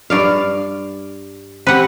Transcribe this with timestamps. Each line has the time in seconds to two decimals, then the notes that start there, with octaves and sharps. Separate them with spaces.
0.10 G2 D5 F5
1.67 C4 G4 B4 F#5